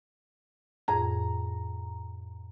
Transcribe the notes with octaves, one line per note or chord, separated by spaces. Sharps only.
F2 A2 G#4 A#5